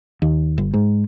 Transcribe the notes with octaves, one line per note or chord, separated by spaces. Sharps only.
D#2
G1
G#2